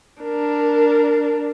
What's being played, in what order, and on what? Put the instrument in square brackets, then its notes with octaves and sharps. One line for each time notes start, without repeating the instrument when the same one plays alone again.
[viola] D4 A#4